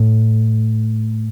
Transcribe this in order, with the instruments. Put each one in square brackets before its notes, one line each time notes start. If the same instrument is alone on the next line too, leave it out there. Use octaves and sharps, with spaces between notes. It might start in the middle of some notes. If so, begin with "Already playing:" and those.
Already playing: [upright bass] A2